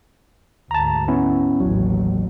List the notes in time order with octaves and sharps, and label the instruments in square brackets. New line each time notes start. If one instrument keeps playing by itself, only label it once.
[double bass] D2 G#2 [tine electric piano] A5 A#5
[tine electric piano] B3 C#4 E4
[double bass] A1 D#2 [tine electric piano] F#3